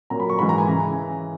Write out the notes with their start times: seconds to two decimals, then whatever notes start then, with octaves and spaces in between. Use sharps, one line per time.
0.10 A#2 F#3 A#5
0.20 B5
0.29 C#6
0.39 G#2 E3 B5
0.49 A#5
0.58 G#5
0.68 C#3 E3 A#5